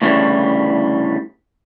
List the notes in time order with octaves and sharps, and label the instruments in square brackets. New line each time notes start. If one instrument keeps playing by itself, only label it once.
[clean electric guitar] D2 A2 C#3 E3 G3